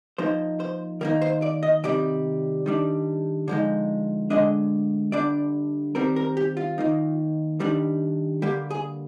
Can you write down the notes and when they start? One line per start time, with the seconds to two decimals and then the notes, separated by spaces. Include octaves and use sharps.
0.18 F3 A#3 D#4 C5
0.60 C5
1.01 D#3 A#3 D#4 A#4
1.22 C5
1.42 D5
1.63 D#5
1.84 C3 D#3 G3 D5
2.66 D#3 G3 D4
3.48 D3 F3 G#3 D#4
4.30 D3 G#3 D4 D#5
5.12 D3 G3 D4 D5
5.95 D#3 G3 C4 A#4
6.16 A#4
6.37 G4
6.57 F4
6.78 D#3 A#3 D#4
7.60 D#3 G3 D4
8.42 D3 G3 A#3 G4
8.70 G#4